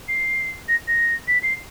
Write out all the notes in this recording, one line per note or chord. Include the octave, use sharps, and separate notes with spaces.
C7
A#6
A#6
B6
C7